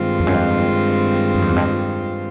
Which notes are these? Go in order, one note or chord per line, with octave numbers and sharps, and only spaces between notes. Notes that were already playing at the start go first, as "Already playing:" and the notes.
Already playing: G2 D#3 G#3 C4 F4
F2
F#2
F2
F#2
F2
E2
F2